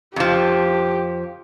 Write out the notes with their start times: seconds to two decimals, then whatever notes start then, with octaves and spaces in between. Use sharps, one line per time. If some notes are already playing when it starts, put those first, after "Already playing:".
0.16 F2 F3 G4